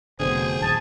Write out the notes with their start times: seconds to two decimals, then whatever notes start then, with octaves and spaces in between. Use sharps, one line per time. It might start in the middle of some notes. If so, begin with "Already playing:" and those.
0.20 F1 B2 D3 G#4 C5
0.62 D#1 A5